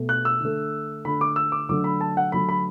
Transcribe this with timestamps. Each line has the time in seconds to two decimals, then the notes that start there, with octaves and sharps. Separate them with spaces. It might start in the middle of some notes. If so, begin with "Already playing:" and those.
Already playing: B2 A3
0.09 F#6
0.25 E6
0.40 D3 A3
1.05 D3 A3 B5
1.21 D6
1.36 E6
1.52 D6
1.69 D3 F#3 A3 D6
1.84 B5
2.01 A5
2.17 F#5
2.32 D3 F#3 A3 B5
2.49 B5